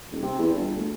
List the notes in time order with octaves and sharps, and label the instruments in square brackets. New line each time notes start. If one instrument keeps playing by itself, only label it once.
[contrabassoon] D#1
C3
E2
G1
D2